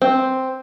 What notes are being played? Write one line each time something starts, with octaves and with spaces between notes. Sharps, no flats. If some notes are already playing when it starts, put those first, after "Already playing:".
C4